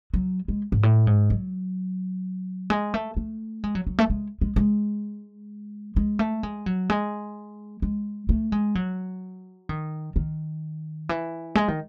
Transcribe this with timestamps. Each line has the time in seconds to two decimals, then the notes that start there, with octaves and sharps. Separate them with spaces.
0.14 F#3
0.48 G#3
0.72 G#2
0.83 A2
1.07 G#2
1.30 F#3
2.70 G#3
2.94 A3
3.17 A3
3.64 G#3
3.75 F#3
3.87 F#3
3.98 A3
4.10 G#3
4.41 G#3
4.56 G#3
5.96 G#3
6.19 A3
6.43 G#3
6.66 F#3
6.90 G#3
7.82 G#3
8.29 A3
8.52 G#3
8.75 F#3
9.69 D#3
10.16 D#3
11.09 E3
11.55 G#3
11.68 D#3